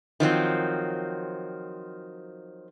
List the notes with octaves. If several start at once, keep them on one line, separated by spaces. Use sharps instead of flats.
D#3 F3 F#3 C4